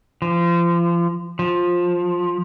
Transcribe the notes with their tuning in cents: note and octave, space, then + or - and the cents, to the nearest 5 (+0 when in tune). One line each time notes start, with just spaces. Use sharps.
F3 -30
F3 +15